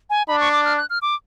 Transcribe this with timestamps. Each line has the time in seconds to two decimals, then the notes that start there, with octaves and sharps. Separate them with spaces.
0.10 G#5
0.28 D4 B5
0.40 C#6
0.53 D6
0.65 F6
0.77 F#6
0.90 F6
1.02 D6